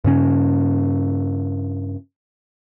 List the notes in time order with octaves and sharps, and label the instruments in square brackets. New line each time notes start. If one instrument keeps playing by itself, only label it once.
[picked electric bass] G2 C#3 C#4